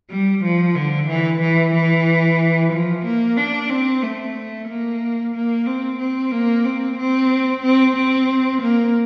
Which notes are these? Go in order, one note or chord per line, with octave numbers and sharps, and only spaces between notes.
G3
F3
D3
E3
E3
E3
F3
A#3
D4
C4
A3
A#3
A#3
C4
C4
A#3
C4
C4
C4
C4
A#3